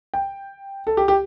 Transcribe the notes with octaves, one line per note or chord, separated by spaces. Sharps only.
G5
A4
G4
G4